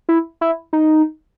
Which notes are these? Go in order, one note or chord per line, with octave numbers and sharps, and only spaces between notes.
E4
E4
D#4